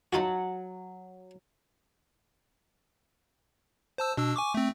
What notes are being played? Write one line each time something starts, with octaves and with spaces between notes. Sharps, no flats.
F#3 D#4 F4 F#4 F#5 A5
C5 A5 E6
B2 D4 E6
G#5 C#6 D6
A3 C4